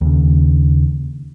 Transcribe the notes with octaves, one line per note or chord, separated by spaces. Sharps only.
D#2 C#3